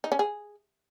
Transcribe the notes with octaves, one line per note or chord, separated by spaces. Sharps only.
D#4
C#4
G#4